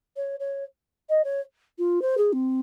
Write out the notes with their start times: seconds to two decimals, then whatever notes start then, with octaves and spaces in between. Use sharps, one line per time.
0.16 C#5
0.39 C#5
1.09 D#5
1.24 C#5
1.78 F4
2.01 C5
2.17 G#4
2.32 C4